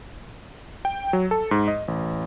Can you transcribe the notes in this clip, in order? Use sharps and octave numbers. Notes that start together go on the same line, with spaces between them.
G5
F#3
A4
G#2
D#5
A1